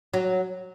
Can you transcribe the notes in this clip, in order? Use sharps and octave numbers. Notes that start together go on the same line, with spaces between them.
F#3